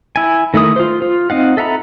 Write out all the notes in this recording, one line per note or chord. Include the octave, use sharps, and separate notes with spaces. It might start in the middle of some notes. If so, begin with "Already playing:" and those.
E4 G#5
D#3 A3 E4 D#6
F4 C5
F4
C4 D#4 F5 F#5
A4 E5 F#5 A#5 B5